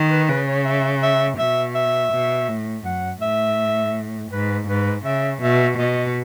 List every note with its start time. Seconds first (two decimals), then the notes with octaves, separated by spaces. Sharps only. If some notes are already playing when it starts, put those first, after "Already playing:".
Already playing: D#3
0.10 B4
0.28 C#3 B4
0.47 C#5
0.65 E5
1.03 E5
1.38 B2 E5
1.75 E5
2.12 B2
2.48 A2
2.85 F#2 F#5
3.21 A2 E5
4.31 G#2 B4
4.68 G#2 B4
5.05 C#3 E5
5.42 B2 E5
5.78 B2 D#5